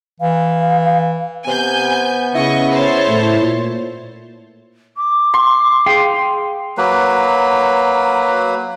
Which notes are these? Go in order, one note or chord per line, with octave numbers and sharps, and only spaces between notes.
E3 F5
C3 B3 G#5 G6
C#3 E4 D#5 C#6
C5 C#5 A5
A2
A#2
D6
C6
G#4 F5 G5
F#3 A#3 B4